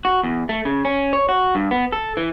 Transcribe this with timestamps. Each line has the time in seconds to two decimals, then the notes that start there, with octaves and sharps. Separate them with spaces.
0.05 F#4
0.23 E2
0.49 A3
0.65 C#3
0.85 C#4
1.13 C#5
1.29 F#4
1.55 G2
1.71 B3
1.92 A4
2.17 E3